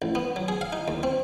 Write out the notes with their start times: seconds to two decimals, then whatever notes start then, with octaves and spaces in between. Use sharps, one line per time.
0.02 A1
0.15 B3
0.36 F#3
0.48 G#4
0.61 F5
0.73 D#4
0.88 D#2
1.03 C4